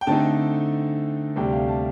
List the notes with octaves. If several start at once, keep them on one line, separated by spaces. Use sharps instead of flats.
G5
D3 A3 C4 D#4 A5
D2 C3 G3 D4 G5
F5
A5